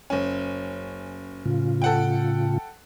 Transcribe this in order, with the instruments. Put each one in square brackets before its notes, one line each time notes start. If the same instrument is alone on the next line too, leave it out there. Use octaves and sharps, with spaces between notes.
[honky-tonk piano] F#1 C#4
[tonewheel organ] A2 C#3 F4
[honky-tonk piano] A4 F#5 G5